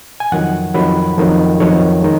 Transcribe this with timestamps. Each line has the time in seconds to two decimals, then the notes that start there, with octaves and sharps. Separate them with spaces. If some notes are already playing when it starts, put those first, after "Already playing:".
0.20 G#5
0.32 F2 D#3 F#3 F#5
0.75 F2 D#3 F#3 B5
1.18 F2 D#3 F#3
1.60 F2 D#3 F#3 C#5
2.02 D#3 G#3